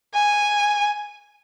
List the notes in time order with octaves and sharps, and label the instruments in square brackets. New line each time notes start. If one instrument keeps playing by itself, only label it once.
[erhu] G#5